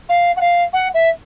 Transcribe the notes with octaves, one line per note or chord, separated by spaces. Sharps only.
F5
F#5
F5
F#5
E5